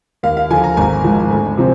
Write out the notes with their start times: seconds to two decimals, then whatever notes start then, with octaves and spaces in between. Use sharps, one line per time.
0.23 D#2 F5
0.37 F5
0.50 D3 F3 G#5
0.64 A#5
0.77 G#1 G#5
1.04 G#2 F3
1.30 D2
1.57 C3 F3 C4